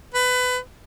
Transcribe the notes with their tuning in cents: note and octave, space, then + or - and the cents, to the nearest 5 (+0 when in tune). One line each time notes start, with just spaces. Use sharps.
B4 +25